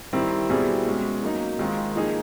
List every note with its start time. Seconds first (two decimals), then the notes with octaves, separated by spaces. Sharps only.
0.13 D#3 G3 C4 E4
0.49 B2 G3 C4 E4 G#4
0.86 B2 G#3 C#4
1.22 F#3 A#3 D#4
1.59 D#3 G#3 C4 F4
1.95 F3 A#3 D#4 G#4